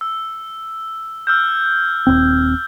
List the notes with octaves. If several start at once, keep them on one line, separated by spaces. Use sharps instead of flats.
E6
E6 F6 G6
D#1 C4